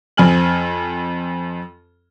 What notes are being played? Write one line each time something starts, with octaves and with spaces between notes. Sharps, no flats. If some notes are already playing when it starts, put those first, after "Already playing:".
F2 C4 G#5 F6 F#7